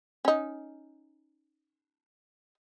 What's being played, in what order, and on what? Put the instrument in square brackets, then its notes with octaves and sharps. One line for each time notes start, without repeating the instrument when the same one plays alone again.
[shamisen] C#4 D#4